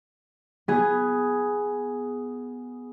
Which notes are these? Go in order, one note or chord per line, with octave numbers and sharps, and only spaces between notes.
B3 G#4